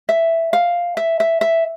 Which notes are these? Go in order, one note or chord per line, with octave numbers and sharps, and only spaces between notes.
E5
F5
E5
E5
E5